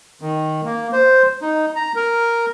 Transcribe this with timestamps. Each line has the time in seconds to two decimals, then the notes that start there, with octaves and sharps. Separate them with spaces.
0.21 D#3
0.65 A#3
0.92 C5
1.42 D#4
1.76 A#5
1.95 A#4